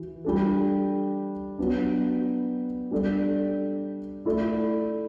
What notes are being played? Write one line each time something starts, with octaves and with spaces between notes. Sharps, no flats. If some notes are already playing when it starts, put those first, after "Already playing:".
Already playing: E3 F#4
G3 D4 A4
F#3 B3 D4
G3 D4 A4 D5
A3 E4 A4 D5